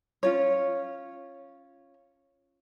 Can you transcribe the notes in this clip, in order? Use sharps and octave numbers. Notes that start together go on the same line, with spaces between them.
C#4 F4 C#5